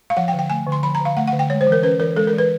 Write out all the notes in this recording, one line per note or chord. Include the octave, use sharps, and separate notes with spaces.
F5
F3 F#5
G5
D3
G5
A3 G#5
D3
C6
F3 B5
A#5
D3
F5
A3 F#5
F#5
D3
G5
G#3 C#5
C5
E3
A#4
C#4 B4
E3 A#4
G#3 A4
A#4
E3
B4